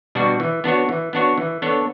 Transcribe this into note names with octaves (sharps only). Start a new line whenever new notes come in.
B2 G3 D4 F#4
E3
B3 D4 F#4 C#5
E3
B3 D4 F#4 C#5
E3
B3 D4 A4 C#5